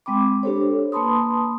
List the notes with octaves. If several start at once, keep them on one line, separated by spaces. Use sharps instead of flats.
G#3 C4 G5 B5 D6
D4 G4 A4 C5 C#5
A#3 B4 A5 B5 C6 D#6